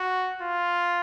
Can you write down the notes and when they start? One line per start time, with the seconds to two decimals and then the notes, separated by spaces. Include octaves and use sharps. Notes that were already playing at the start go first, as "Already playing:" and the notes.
Already playing: F#4
0.42 F4